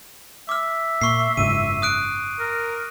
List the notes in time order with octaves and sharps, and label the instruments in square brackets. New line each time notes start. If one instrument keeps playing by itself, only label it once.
[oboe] E5 [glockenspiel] D6 F6
[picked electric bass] A#2 [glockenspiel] C#6 C7
[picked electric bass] F#1 G#2 C#3 [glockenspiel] D#7
[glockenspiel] D#6 F#6 D7
[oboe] A#4